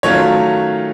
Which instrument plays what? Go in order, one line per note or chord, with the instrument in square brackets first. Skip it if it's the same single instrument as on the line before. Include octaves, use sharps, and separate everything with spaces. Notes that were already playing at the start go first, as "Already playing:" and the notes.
[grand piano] D#3 F#3 A3 C#4 F4 C#5